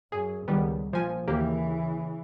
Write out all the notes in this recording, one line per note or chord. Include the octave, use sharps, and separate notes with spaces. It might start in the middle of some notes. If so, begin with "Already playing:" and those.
F#2 G#4
C#2 D#3 G3 B3
A#1 A#2 F3 G#5
D#2 C#3 E3 A#3 G4